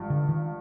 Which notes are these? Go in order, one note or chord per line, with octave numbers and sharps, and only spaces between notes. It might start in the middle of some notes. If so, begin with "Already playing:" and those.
Already playing: G#1 G2 F3
D3
D#3